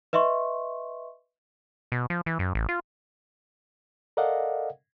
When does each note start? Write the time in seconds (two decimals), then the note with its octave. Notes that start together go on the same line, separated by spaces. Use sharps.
0.13 B4 D#5 E5 C6 C#6
1.92 B2
2.10 F3
2.26 E3
2.39 F#2
2.55 A1
2.69 F4
4.17 A4 A#4 D5 D#5 F5 F#5